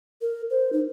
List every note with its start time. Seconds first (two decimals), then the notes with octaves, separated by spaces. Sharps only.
0.21 A#4
0.50 C5
0.73 D#4